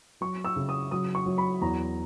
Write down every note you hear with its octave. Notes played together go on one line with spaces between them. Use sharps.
F#3 C#6
E6
C#3
D#6
F#3 D#6
C#6
F#3
B5
E2 A#5